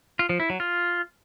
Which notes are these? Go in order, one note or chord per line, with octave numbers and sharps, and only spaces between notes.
F4
F3
E4
F#3
F4